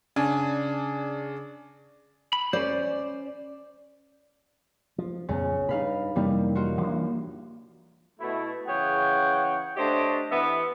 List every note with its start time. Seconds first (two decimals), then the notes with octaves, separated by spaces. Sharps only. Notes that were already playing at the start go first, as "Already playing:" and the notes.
0.16 C#3 D4 G#5
2.33 B5
2.53 C#4 C5 D5
4.98 F3
5.29 A#1 F2 C#3 B3
5.69 G2 D#4 F5 B5
6.16 F2 C3 E3 G3 A#3 D#4
6.55 D#4 F4 F#4
6.81 E3 A#3 D4
8.20 B2 A3 E4
8.67 C#3 E3 G#4 C#5 F#5 G5
9.76 A3 D4 G4 C5 C#5 D#5
10.30 E3 B3 E5